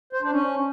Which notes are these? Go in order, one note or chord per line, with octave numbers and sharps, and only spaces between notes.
C5
D4
C#4